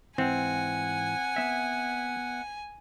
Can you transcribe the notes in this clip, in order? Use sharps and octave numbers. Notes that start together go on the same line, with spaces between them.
G#2 E3 C4 F#5 G#5
B3 E5